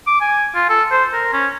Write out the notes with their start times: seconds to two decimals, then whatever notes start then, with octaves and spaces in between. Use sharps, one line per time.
0.07 D6
0.21 G#5
0.55 F4
0.69 A4
0.91 C5
1.13 A#4
1.33 C#4